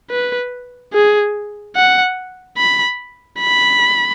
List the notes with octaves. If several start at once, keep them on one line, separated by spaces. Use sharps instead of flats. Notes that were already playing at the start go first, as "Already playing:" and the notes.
B4
G#4
F#5
B5
B5